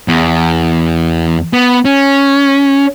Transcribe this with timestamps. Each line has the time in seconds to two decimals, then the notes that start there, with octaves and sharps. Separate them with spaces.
0.08 E2
1.53 B3
1.85 C#4